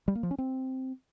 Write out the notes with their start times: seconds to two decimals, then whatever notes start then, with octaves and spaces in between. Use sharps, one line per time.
0.08 G3
0.15 A#3
0.23 F3
0.31 C#4
0.38 C4